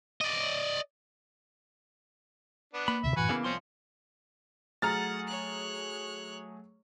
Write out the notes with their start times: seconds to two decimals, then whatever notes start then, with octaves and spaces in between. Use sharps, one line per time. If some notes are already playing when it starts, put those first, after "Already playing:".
0.21 D5 D#5
2.73 B3 D4
2.88 A#3 B5
3.04 D2 A2 C3 E5
3.17 F#2 A2 E3 F#4 B4 G#5
3.29 C#3 E3 A#3 B3
3.44 C2 F3 C4 C#4 C6
4.82 F#3 A3 G#4 F#5 A#5 F6 A6
5.27 C#5 F#6